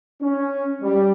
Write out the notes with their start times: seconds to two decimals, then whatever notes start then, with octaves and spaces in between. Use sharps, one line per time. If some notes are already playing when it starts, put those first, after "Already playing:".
0.21 C#4
0.81 G3